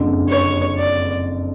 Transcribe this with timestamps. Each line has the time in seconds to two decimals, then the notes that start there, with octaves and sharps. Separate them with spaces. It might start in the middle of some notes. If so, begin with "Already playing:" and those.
Already playing: F#1 F2 D3
0.29 C#5
0.78 D5